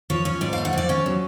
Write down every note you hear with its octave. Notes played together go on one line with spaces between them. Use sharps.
F3 C#5
C#4 C#5
G#2 D5
A3 F5
F#5
F3 D5
C#4 C#5
F#3